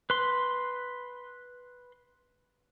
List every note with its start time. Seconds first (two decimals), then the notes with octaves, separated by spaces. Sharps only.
0.10 B4 C6